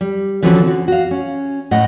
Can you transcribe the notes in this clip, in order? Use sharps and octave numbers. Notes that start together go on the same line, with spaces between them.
G3
D3 E3 F3 C4 C#4 F#4
F#4
F#4 F5
C#4
A2 D#5 F#5